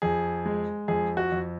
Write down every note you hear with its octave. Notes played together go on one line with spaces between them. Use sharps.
F2 G#4
G#3
F2 G#4
F#4
F2